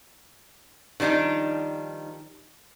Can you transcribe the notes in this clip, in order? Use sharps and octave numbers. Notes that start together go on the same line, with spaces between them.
D#3 F3 G3 D4 D#4